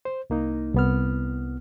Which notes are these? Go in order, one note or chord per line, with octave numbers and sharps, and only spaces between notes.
C5
C2 A#3 D#4
C2 B3 F6